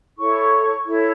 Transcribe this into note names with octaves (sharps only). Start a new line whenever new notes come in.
E4 A4 C#5 C#6
E4 A4 C#5